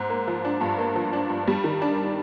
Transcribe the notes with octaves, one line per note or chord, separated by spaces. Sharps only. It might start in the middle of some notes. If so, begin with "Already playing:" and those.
Already playing: G#2
A#3
F3
D4
G2
A#3
F3
D4
G2
G3
D#3
D4